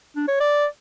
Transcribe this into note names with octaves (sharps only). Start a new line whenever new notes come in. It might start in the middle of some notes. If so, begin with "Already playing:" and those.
D4
C#5
D5